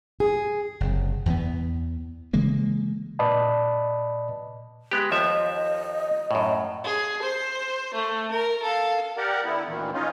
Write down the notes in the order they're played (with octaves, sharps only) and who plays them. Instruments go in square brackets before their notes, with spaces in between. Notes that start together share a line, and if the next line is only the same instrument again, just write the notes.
[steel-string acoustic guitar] G#4
[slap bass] F#1 C3
E2 E3 B3
C#3 E3 G#3 A#3
[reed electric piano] A#2 B4 D5 D#5 A5 B5
[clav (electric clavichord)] G#3 B3 G4
[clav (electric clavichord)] D#2 F3 E5 [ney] D#5
[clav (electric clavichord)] F#2 A2
[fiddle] G#4
C5
A3
A#4
A4 F5
[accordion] G4 A#4 D5 F#5
D3 B3 E4
D2 A#2 D#3 E3
C#4 D#4 F4